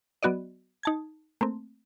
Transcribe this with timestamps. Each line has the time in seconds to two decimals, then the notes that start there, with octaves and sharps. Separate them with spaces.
0.23 F#3 B3 F#4 D5 D#5
0.83 D#4 A5 G#6
1.41 A3 A#3 C4